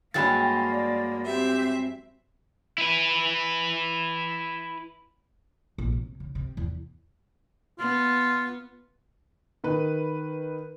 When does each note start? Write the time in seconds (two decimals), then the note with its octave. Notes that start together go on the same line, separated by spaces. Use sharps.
0.14 G2 F#3 G#3 A#3 G5 B5 A6
0.71 D5
1.25 C4 G4 E5
2.78 E4 B4
5.78 A#1
5.92 C3
6.20 C#3
6.35 C3
6.57 E2
7.79 B3 F4
9.64 D#3 B4